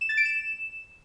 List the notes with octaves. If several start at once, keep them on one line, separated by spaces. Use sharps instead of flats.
E7
A6
D7
E7